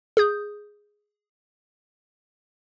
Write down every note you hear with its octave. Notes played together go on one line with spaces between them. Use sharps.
G#4 D#6 G6